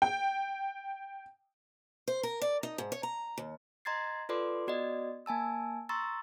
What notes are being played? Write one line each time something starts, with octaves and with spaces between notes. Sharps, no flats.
G5
C5
A#4
D5
D#4
G#2
C#5
A#5
D#2
D#5 A#5 C6 G#6 A6 C7
F4 A4 B4 D5 C6 D6
B3 F#4 D5 D#5
A#3 G#5 A5 E6
A#5 C6 C#6 E6 A6